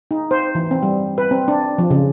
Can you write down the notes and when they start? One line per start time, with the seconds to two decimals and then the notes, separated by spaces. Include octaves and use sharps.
0.11 D#4
0.31 C5
0.55 E3
0.71 C4
0.83 G3
1.18 B4
1.31 C4
1.48 D4
1.78 F3
1.90 C#3